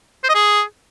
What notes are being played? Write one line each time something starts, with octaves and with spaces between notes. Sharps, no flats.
C5
D#5
G#4